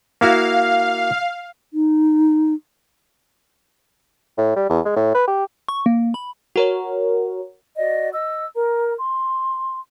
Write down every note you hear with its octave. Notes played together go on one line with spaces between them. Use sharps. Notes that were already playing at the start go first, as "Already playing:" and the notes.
A#3 E4 F#4 F5
D#4
A2
G3
E2
G#3
A2
B4
G4
C#6
A#3
B5
F#4 A#4 C#5
F#4 D5 D#5
D#5 E6
A#4 A#5
C6